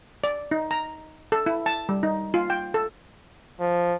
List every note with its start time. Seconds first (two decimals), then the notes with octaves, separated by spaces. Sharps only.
0.24 D5
0.51 D#4
0.71 A#5
1.32 A4
1.46 E4
1.66 A5
1.89 G3
2.03 D#4
2.34 F4
2.50 G5
2.74 A4
3.60 F3